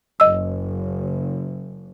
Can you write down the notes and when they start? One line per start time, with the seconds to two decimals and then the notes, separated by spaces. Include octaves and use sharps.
0.20 F#1 D#5 E6